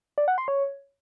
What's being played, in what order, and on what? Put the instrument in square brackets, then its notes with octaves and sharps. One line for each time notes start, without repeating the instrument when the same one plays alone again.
[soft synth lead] D5
F#5
C6
C#5